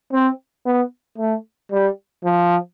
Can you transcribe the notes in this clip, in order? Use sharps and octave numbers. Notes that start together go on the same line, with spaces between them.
C4
B3
A3
G3
F3